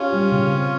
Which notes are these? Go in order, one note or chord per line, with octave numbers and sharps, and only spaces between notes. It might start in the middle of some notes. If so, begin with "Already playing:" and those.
Already playing: C#4 F4 G4
G3
C#3
C4